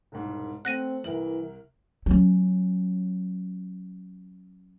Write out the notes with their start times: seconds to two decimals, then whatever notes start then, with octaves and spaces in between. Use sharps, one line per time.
0.12 E1 C2 G#2
0.65 A3 C4 F#5 F#6 A#6 D#7
1.04 C2 E3 A#4 F#7
2.06 F#3 C#4